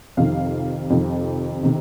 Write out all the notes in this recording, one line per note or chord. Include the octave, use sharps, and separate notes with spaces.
F2 C3 D#3 F5
F2 C3 D#3
C3 D#3